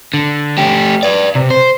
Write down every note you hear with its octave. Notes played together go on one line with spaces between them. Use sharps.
D3
A3 G4
B4 D5
C3
C5